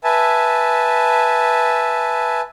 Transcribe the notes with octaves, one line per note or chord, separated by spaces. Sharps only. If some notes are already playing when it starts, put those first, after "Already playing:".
B4 E5 G#5 A5